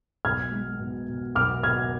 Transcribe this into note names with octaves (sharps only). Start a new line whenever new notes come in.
B1 F6 G#6
G#3
B2
B2
B1 D6 F6
B2 F6 G#6